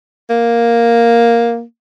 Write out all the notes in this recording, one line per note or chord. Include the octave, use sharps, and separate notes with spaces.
A#3